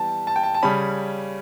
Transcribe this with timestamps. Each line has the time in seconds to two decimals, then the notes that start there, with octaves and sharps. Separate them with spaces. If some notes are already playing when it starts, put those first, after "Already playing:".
Already playing: E3 G3 B3 G5 A5
0.27 A5
0.36 G5
0.43 A5
0.54 A5
0.63 C#3 G3 C#4 B5